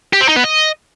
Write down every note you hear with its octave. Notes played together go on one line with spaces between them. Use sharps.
G4
C4
D#4
B3
D#5